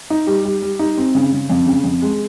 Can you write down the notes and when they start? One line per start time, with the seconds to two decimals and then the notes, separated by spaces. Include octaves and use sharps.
0.10 D#4
0.27 G3
0.45 G3
0.62 G3
0.79 D#4
0.97 C4
1.15 C#3
1.32 C#3
1.50 F2
1.66 C#3
1.84 F2
2.02 G#3